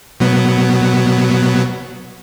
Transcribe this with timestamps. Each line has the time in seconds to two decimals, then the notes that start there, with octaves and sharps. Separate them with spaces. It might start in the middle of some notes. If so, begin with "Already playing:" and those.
0.20 B2 F#3 B3